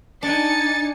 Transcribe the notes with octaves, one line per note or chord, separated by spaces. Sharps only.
D4 D#4 G#5 A6 C#7